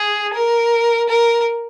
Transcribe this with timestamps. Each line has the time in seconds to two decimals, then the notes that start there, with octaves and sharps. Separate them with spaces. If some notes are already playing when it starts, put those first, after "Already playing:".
Already playing: G#4
0.34 A#4
1.09 A#4